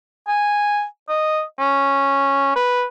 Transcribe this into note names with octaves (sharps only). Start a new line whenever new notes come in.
G#5
D#5
C#4
B4